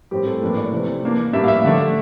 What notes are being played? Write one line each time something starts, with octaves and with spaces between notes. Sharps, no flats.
A2 G3 C4 G4
A4
A2 E3 A#3 D4 A#4
D5
C3 E3 A3 C4
E3 A#3 D4
A2 G3 A#3 D4 E5
F5
E5
D3 A3 D4